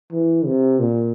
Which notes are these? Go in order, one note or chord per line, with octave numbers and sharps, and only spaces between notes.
E3
C3
A#2